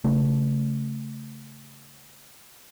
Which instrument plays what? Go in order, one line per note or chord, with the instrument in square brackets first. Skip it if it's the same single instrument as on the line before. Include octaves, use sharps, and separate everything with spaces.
[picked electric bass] C#3 A3